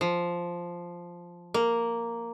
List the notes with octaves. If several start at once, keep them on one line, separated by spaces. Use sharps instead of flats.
F3
A#3